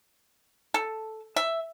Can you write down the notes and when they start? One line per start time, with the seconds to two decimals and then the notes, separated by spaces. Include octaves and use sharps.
0.74 A4
1.36 E5